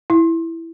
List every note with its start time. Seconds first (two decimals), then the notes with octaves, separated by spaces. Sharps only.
0.10 E4